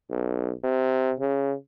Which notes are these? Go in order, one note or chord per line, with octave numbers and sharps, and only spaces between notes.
B1
C3
C#3